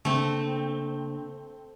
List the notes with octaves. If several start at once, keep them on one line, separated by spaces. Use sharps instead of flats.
C#3 A3 A#3 C4 D4